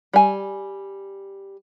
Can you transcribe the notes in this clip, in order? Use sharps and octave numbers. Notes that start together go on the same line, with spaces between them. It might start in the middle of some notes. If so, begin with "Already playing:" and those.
G3 G#5